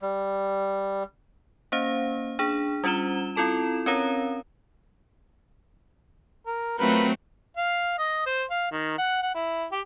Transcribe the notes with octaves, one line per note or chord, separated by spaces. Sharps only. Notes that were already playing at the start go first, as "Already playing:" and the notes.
G3
A#3 C#4 C5 F5
D4 G#4
G3 C#4 F4 C5 E7 G7
C4 E4 F4 A4 A5 E7
C4 C#4 A#4 C#5 F5 A#5
A#4
F#3 A3 C4 F4 A#4 B4
F5
D#5
C5
F5
D#3
F#5
F#5
E4
G4